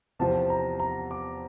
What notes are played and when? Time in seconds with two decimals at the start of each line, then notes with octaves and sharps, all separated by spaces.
0.19 E2 C3 F3 A5
0.50 A#5
0.80 A#5
1.11 D6